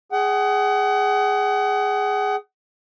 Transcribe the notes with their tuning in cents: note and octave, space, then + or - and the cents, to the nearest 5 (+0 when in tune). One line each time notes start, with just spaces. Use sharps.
G#4 +0 F#5 +35